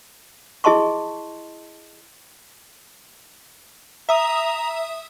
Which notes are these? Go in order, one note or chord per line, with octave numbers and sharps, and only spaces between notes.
E4 G#4 D#5 A5 C6 C#6
E5 A#5 D#6